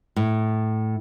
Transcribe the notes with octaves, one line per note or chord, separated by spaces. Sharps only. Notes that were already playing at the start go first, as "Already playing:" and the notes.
A2